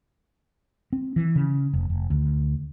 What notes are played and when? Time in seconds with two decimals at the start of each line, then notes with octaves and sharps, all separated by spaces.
0.93 C4
1.16 E3
1.36 C#3
1.73 F1
1.90 F1
2.10 D2